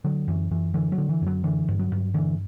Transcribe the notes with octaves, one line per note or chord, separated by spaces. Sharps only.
D3 F#3
F#2 E3
F#2 E3
D3 E3
F#3
D3
E3
F#2 F#3
D3 E3
G2
F#3
G2
D3 E3